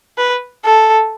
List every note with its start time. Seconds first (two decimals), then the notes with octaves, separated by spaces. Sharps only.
0.18 B4
0.65 A4